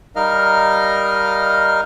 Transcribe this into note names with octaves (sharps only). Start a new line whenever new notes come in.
G3 D#4 A#4 D#5 F5 F6